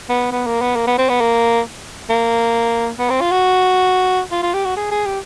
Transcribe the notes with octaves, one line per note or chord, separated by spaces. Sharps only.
B3
B3
A#3
B3
A#3
B3
C4
B3
A#3
A#3
B3
C4
F4
F#4
F4
F4
G4
F#4
G#4
G#4
G4